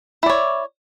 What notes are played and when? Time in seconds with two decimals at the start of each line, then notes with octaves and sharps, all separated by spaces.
0.23 E4
0.26 D5
0.29 C#5